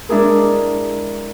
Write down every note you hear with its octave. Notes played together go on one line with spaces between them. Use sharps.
G#3 D4 E4 G#4 A#4